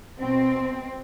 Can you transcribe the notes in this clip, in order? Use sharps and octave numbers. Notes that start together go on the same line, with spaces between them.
B2 C4